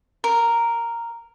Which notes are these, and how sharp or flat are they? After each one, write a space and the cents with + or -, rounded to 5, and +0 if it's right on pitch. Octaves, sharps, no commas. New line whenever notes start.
A#4 -5